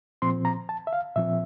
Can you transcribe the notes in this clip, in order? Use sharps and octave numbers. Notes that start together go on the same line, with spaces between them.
A#2 F3 C4 C6
A#5
A5
E5
F5
A#2 F3 C4 E5